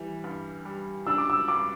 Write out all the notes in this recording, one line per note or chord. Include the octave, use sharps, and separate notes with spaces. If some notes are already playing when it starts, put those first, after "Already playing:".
Already playing: E3 G3
G2
G3
D4 E6
D6
E6
G2 D6